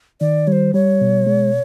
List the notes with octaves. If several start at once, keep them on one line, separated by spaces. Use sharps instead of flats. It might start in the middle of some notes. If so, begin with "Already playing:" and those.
D#3 D5
G3 C5 C#5
G3 C#5
B2
G#3